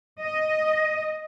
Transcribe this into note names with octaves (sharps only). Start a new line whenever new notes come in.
D#5